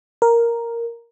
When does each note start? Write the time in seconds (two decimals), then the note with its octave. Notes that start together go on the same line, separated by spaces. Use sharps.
0.22 A#4